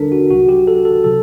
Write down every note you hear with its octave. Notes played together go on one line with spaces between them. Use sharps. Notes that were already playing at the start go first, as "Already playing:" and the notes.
Already playing: D#2 D3 G3 D4 A4 A#4
F#4
C2 C3 F#3 F#4
G4
A4
A4
C3 F#3 A4